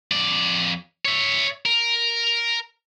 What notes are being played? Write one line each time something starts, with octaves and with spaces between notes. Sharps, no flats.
F2 D5
C#5 E5
A#4